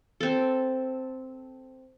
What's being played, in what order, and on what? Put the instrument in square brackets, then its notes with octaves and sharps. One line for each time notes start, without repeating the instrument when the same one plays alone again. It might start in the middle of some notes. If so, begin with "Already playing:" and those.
[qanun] C4 A4